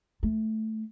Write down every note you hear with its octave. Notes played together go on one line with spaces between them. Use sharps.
A3